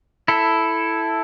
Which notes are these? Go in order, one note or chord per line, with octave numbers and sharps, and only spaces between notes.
E4 A4